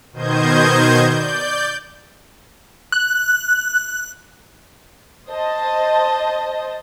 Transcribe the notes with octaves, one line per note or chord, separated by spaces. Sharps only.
B2 D#3 C5 D#5 G6 G#6
D5 G6
F#6
C5 D#5 A5